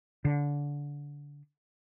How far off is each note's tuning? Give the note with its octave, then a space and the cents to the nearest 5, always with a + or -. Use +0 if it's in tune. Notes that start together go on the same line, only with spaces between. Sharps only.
D3 -25